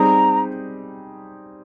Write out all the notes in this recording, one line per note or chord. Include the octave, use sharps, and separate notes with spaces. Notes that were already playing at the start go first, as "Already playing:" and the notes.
Already playing: G3 C4 D#4 G#4 A#5